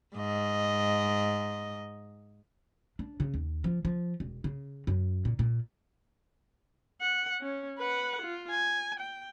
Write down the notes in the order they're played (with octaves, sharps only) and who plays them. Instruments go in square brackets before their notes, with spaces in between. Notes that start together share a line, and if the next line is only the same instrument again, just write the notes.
[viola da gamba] G#2 D#5
[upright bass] D4
C#3
D#2
F3
F3
E1
C#3
F#2
A#2
A#2
[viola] F#5
C#4
B4 F#5
F4
G#5
G5